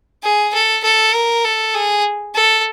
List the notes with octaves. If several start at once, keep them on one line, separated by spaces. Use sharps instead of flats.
G#4
A4
A4
A#4
A4
G#4
A4